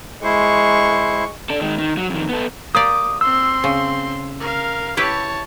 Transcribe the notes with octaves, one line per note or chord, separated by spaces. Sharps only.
G#3 E4 C5 C#6
D4 A4
D#3 G#3
D#3
F#3
F2 D#3
B3 A4
A#3 G4 D5 D6 D#6
C4 C6 E6
C#3
A#4 F5
E4 G4 B4 C#5 A5